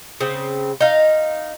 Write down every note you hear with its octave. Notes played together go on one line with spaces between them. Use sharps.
C#3 C4
D#4 F5